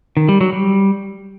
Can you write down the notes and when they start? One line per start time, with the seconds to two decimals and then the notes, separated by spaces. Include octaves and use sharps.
0.17 D#3
0.29 G3
0.41 F#3
0.53 G3